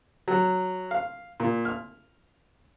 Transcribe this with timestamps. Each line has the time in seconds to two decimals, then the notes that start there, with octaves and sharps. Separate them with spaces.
0.28 F#3
0.91 F5
1.40 A#2
1.65 F6